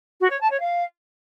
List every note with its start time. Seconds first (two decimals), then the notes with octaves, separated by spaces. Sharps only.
0.20 F#4
0.30 C#5
0.40 A5
0.50 C#5
0.60 F5